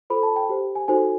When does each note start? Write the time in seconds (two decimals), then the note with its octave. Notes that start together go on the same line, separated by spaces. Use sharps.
0.10 F4 A4 C5 B5
0.23 A5
0.36 G5
0.49 G4 C5
0.75 G#5
0.88 D#4 F#4 A4 C5 G#5